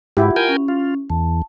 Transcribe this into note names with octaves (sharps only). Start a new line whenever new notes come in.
G#2 E4 F4 G4 F#5
A#4 G5 G#5
C#4
F4
E2 A5